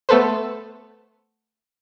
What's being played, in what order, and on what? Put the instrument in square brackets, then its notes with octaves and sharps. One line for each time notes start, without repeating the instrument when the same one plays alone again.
[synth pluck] A3 B3 A4 B4 C5